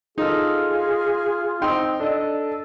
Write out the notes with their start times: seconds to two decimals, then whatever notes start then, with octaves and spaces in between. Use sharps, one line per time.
0.18 D#4 F4 G#4 A4
1.62 C4 D#4 G5 C6
2.00 D4 A4 D#5